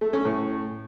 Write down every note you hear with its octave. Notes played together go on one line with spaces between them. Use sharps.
A3
C#4
A2